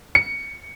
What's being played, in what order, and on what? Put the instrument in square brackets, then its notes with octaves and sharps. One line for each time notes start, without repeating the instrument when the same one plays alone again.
[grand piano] C#7